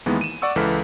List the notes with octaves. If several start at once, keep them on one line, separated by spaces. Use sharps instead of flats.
D#2 D#3 E3 G#3 A#3 B3
D#7 E7
D5 F#5 C#6 E6
C#2 E3 A4 B4 F6 B6